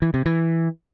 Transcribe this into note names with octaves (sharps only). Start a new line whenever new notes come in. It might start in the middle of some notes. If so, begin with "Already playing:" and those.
E3
C3
E3